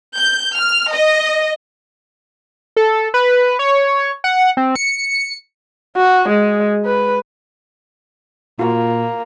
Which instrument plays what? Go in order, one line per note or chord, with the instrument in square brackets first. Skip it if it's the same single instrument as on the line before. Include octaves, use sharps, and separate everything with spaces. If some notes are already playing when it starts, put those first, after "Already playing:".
[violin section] G6
F6
D#5
[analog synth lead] A4
B4
C#5
F#5
C4
C#7
[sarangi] F#4
G#3
B4
[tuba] A#2 [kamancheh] A#3 [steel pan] F4 F#4